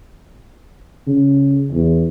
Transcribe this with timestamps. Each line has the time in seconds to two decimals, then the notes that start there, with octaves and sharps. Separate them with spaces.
1.07 C#3
1.72 E2